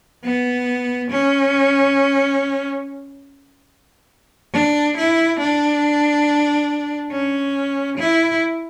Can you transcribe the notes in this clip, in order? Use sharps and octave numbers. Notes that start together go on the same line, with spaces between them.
B3
C#4
D4
E4
D4
C#4
E4